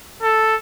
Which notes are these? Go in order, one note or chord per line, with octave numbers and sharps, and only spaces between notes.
A4